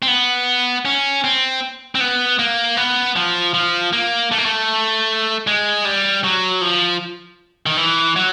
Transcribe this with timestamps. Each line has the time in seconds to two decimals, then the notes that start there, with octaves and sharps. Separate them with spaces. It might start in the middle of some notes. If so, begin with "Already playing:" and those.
0.02 C4
0.08 B3
0.85 C#4
1.24 C4
1.95 C4
2.00 B3
2.39 A#3
2.77 B3
3.16 F3
3.54 F3
3.93 A#3
4.31 A3
4.38 A#3
4.46 A3
5.47 G#3
5.85 G3
6.24 F#3
6.61 F3
7.66 D#3
7.77 E3
8.16 F#3